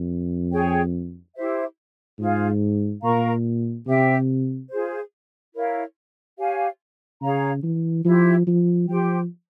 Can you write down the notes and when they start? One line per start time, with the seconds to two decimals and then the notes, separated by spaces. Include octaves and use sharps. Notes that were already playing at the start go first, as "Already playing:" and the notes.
Already playing: F2
0.51 G#4 C#5 G5
1.35 E4 G4 C5 E5
2.19 G#2 F4 G#4 C5 F5
3.03 A#2 A#4 F5 A#5 C#6
3.86 C3 G4 C5 E5 G5
4.70 F4 G#4 C5
5.54 E4 A#4 C#5 F5
6.37 G4 C#5 F5 G#5
7.21 C#3 G#4 C#5 F5 A#5
7.63 E3
8.05 F3 E4 G4 C5
8.47 F3
8.89 F3 G4 C5 G5